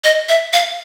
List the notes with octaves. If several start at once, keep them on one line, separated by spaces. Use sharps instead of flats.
D#5
E5
F5